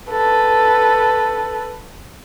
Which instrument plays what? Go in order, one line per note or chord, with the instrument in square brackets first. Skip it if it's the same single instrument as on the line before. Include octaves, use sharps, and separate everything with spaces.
[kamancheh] A4 B4